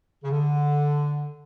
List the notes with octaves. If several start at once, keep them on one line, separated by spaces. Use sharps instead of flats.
C#3
D3